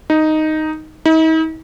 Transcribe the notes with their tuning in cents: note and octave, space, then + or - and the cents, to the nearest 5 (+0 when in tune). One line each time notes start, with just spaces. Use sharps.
D#4 +0
D#4 +45